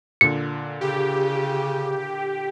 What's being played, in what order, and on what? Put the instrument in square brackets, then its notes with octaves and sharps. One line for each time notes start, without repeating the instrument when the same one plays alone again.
[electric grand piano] A#2 D3 [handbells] C#7
[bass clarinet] C#3 [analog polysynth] G4